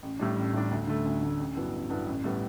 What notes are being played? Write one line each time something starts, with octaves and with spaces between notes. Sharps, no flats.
A1
A2 G3 D4
A1
A2 G3 D4
D2
D3 A3
D2
D3 A3
A1
G2 F#3 B3 E4
A1
G2 F#3 B3 E4
A1
A2 G3 B3